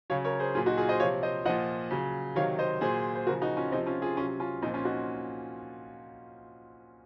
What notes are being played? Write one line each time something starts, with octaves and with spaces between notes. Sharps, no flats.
C#3 F#3 C#5 F5
A#4 C#5
G#4 C5
A#2 F#3 F4 G#4
D#4 F#4
F4 G#4
C5 D#5
C3 F3 C#5 F5
C5 D#5
A#2 F3 D#5 F#5
C#3 F#3
C3 D#3 F#3 C#5 F5
C5 D#5
A#2 F#3 G#4 C5
C5
C#3 F3 F#4 A#4
D#4 F#4
C#4 F4
C3 F3 C4 D#4
C#4 F4
F4 G#4
C3 F#3 C#4 F4
C#4 F4
A#2 F3 C4 D#4
C#4 F4
D#4 F#4